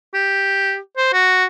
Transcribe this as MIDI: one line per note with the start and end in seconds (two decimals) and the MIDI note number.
0.14 0.78 67
0.97 1.10 72
1.13 1.45 66